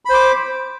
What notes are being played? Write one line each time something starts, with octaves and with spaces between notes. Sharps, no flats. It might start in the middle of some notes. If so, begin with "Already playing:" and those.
C5 B5 D6